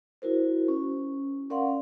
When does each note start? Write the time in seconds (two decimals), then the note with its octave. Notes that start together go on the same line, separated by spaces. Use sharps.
0.22 E4 F#4 A#4 C5
0.68 C#4
1.50 C#4 A#4 D5 F5 F#5 C6